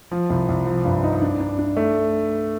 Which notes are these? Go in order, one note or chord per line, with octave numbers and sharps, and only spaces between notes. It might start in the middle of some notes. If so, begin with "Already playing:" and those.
F3
C2
C2
F3
G2
D#4
D4
D4
D4
A3